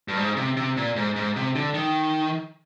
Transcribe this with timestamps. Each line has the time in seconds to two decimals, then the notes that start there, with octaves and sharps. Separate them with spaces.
0.08 G2
0.17 G#2
0.37 C3
0.57 C3
0.77 A#2
0.96 G#2
1.16 G#2
1.36 C3
1.55 D3
1.74 D#3